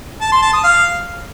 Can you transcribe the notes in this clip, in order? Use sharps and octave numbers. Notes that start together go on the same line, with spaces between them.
A5
C6
A5
D#6
F5